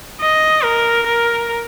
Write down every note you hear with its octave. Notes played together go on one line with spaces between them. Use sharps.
D#5
A#4
A#4